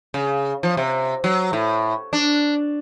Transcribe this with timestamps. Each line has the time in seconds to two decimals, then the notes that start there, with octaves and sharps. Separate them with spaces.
0.14 C#3
0.63 F3
0.77 C3
1.24 F#3
1.53 A2
2.13 D4